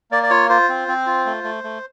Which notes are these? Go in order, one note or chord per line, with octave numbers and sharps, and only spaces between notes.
A#3 D5
D5
F4 C#5
F4 C5
C4
C4
F4
A3
A3
A3